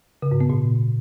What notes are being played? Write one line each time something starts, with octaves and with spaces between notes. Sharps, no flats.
C#3
G#2
B3
A#2